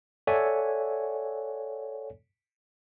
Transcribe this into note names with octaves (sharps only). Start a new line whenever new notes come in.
A4 C#5 D5 E5 F#5 G#5